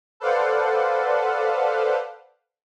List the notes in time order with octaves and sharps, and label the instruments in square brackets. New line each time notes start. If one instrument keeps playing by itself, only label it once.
[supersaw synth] A4 B4 C5 D5 F5 F#5